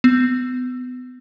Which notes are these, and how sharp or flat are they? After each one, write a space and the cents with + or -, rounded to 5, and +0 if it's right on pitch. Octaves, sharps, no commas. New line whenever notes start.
B3 +30